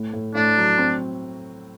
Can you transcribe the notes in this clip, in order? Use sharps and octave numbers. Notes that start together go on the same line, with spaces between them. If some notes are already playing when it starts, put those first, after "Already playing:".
Already playing: A2
A2
A2 D4
F#3
C4